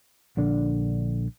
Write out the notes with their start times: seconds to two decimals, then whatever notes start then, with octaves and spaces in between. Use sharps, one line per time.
0.37 A#1 D3 D4